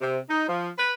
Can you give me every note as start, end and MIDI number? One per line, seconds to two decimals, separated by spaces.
0.01 0.19 48
0.30 0.47 63
0.48 0.70 53
0.78 0.94 71